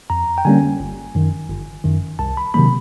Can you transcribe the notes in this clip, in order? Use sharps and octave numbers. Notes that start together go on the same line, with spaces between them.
F2 A#5
G5
D3 G3 A#3 C#4 G#5
G1
F#2 D#3
G1
F#2 D#3
C2 A5
B5
C3 D#3 F#3 A#3 B5